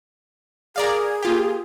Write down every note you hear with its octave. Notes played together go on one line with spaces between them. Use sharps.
G#4 A#4 D5 F5
A#3 F4 G4